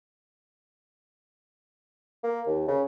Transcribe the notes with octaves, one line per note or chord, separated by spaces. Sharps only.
A#3
D#2
C#3